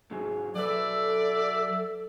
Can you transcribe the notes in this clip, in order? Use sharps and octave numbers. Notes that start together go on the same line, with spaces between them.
G#2 F#3 G#4
F#3 A4 B4 D5 E5